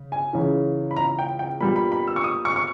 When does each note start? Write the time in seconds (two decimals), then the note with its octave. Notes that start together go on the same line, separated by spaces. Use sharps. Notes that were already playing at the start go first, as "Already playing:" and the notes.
Already playing: C#3
0.12 G#5
0.33 C#2 C#3 E3
0.91 B5
0.96 A#5
1.19 G5
1.39 G5
1.61 A#2 G3 B3 B5
1.76 B5
1.92 B5
2.08 E6
2.16 C#6
2.24 D#6
2.45 C#6
2.56 C#6